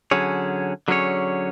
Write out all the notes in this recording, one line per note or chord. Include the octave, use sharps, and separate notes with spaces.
D3 F#3 C#4 G#4 C#5
D3 F#3 C#4 G#4 C#5